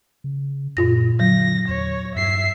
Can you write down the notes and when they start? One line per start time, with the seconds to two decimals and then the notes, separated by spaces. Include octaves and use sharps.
0.24 C#3
0.77 F#2 A#2 F4 A#6
1.20 D3 F#3 A#6
1.68 E2 C#5
2.16 G2 E5 C7